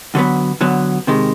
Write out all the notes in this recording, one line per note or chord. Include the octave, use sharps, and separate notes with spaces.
D3 F#3 B3
D3 F#3 B3
C3 D#3 G#3